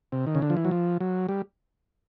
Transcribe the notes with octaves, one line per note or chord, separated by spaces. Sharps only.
C3
D#3
C#3
D3
F3
E3
F#3
F3
F#3
G3